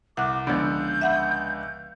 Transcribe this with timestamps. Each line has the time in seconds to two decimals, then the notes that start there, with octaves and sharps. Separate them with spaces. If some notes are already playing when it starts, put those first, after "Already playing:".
0.17 C2 F#5 D6 F#6
0.47 C#2 D3 F3 B3 G6
1.01 E5 F#5 B5